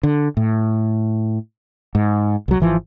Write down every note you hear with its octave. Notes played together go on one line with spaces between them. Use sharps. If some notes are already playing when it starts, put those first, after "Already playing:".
D3
A2
G#2
C2 F#3
G#1 E3 F3